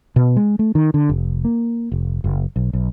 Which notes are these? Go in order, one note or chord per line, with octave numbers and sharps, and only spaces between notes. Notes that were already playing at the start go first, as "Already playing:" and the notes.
B2
G#3
A3
D#3
D3
F1
A#3
F1
F#1
B1
B1